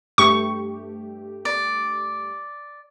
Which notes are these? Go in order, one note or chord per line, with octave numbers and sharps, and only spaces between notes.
G2 A3 G4 C#6
D5